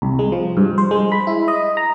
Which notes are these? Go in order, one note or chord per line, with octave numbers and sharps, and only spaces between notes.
C2
G#3
F3
G2
C5
G#3
B5
E4
D#5
A#5